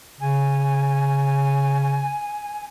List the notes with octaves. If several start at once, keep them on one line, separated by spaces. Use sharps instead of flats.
C#3 G#5